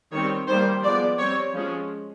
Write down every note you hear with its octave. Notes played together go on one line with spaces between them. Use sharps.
D#3 G3 C4 C#5
D#3 G3 A#3 C5
F3 G#3 B3 D5
G3 C4 C#5
F3 G#3 C#4